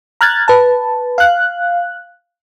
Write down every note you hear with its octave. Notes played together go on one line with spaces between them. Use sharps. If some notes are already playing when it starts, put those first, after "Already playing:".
A#5 F6 F#6 G#6 A6
B4 A5
F5 F#6